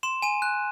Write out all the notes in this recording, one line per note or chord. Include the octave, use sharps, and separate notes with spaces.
C6 E7
G#5 D#7
F#6